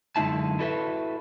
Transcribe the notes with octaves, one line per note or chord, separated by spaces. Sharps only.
F#2 D3 G#3 D#4 E4 A5
E4 F#4 A4 B4 D5 E5